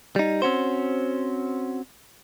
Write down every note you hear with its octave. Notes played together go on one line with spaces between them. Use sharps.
G3 D#4
C4 C#4 F#4 C5